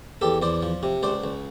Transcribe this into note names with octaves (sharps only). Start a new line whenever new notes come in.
E2 G4 A4
E2 C5 D5
F3
C3
C#2 C5 D5
C#2